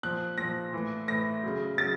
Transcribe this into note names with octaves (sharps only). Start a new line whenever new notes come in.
A#2 F3 F#6
A#2 F3 A#6
A2 E3
A2 E3 A#6
C#3 F#3
C#3 F#3 A6